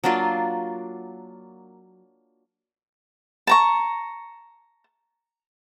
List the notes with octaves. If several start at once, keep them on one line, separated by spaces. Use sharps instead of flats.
F#3 A#3 D4 F4
A5 A#5 C#6